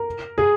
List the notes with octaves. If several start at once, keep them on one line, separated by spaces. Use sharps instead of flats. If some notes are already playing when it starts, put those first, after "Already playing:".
Already playing: A#4
G#4